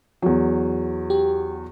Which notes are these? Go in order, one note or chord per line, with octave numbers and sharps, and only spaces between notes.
E2 F#3
G4